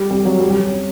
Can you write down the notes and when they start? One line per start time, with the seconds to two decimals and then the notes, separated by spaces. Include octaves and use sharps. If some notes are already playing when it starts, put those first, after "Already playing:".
Already playing: G3
0.11 G3
0.25 F#3
0.41 G3
0.51 G3
0.60 C#4